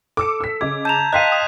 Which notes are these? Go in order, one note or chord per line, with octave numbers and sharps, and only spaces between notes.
A4 D6 E6 C#7
E6 B6
C#3 D#5 D6 G#6
A5 A#5 G6 E7 F7
D#5 F5 G5 A5 C6 F#6 B6 D#7
D#6